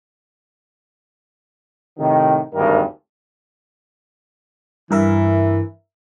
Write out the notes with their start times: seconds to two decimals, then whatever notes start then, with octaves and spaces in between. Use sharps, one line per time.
1.98 A2 C3 D#3
2.55 G#1 D2 G2 D#3 A#4
4.91 G2 E3 A#4 E5